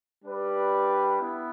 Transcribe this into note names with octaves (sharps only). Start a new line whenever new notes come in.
G3 D4 G4 B4 D5
B3 E4